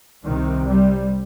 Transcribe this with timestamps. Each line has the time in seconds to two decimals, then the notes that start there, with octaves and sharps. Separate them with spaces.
0.24 C2 C3 D#3
0.67 G3